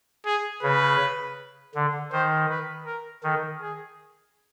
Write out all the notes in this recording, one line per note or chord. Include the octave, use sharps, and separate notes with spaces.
G#4
C#3 B4
D3
D#3 C5
B4
A#4
D#3 A4
G#4